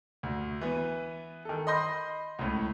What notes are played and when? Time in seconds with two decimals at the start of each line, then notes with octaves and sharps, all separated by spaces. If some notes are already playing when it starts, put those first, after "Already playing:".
0.23 D2
0.61 E3 B3
1.45 D#3 A4
1.67 D#5 B5 C6 G6 A#6
2.39 C#2 A2